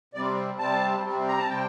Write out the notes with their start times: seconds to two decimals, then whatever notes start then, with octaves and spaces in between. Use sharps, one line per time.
0.14 C3 D5
0.17 G3 C4
0.59 C3 G3 C4 A5
1.03 C3 G3 C4
1.28 A#5
1.39 A5
1.49 C3 G3 C4 G5